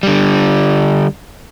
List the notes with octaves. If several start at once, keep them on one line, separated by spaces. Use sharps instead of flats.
D3 G3